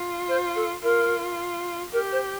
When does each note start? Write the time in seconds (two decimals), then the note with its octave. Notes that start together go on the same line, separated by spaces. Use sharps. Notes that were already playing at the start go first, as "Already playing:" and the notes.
Already playing: F4
0.28 C5
0.56 A4
0.83 F4 A#4
1.93 G4 A#4
2.12 C5